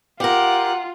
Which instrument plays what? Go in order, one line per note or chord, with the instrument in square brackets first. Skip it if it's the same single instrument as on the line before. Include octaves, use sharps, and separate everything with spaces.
[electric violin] F4 [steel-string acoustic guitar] G4 A#4 [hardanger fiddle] F#5